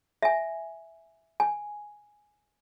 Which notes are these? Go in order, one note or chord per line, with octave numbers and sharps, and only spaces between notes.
E5 G#5
G#5